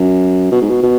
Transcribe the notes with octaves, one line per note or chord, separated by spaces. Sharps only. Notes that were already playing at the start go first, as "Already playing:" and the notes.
Already playing: F#2
B2
G#2
B2
B2